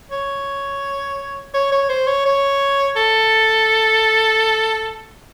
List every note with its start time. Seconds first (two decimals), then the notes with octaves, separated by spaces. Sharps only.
0.11 C#5
1.54 C#5
1.72 C#5
1.89 C5
2.07 C#5
2.25 C#5
2.96 A4